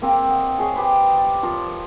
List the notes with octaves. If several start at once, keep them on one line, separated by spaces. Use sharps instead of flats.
A#3 C4 A#4 F5
D#5 F#5
G#4 C#5 D#5 E5
G4 B4 C5
D5
F3 F4 A#4